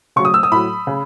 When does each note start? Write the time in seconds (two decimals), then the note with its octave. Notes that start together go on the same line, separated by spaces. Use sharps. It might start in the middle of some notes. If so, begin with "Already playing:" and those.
0.16 C#3 F#3 C#6
0.25 D#6
0.34 E6
0.43 D#6
0.52 A2 F#3 B5
0.87 C#3